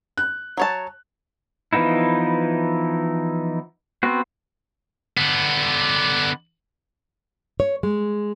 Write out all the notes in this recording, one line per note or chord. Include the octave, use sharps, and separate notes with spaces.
F#6
F#3 C#5 A5
E3 F3 B3 D#4 E4
B3 C4 F#4
D3 B3
C#5
G#3